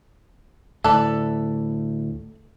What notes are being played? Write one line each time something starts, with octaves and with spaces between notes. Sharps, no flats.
D2 A2 A4 B4 D5